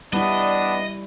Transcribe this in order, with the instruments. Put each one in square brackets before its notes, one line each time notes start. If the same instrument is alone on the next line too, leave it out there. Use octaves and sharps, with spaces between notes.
[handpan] G3 E4 [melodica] B3 [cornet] D4 [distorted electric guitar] D#5